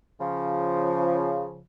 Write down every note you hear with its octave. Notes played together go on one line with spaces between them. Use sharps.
C#3 F3